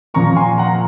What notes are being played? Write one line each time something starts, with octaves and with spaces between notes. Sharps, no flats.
A#2 F3 A#3 A#5 C#6
G#5 C6
F#5 A#5